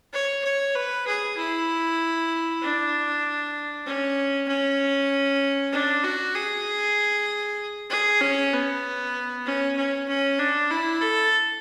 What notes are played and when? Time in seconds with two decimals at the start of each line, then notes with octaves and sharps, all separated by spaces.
0.13 C#5
0.44 C#5
0.75 B4
1.07 G#4
1.37 E4
2.62 D4
3.86 C#4
4.48 C#4
5.73 D4
6.04 F#4
6.35 G#4
7.90 G#4
8.21 C#4
8.53 B3
9.45 C#4
9.77 C#4
10.09 C#4
10.39 D4
10.71 E4
11.01 A4